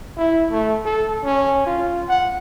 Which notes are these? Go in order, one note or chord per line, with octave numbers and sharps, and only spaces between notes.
E4
A3
A4
C#4
F4
F#5